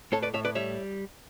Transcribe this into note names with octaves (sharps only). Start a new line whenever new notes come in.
A2 A4 C#5
B4 D5
A2 C#5 E5
B4 D5
G3 C#5 E5